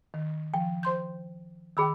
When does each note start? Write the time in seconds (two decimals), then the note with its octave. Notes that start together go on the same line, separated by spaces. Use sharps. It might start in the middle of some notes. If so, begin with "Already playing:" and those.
0.14 D#3
0.54 F3 G5
0.83 C5 C6 G6
1.77 D#3 G#4 G5 B5 E6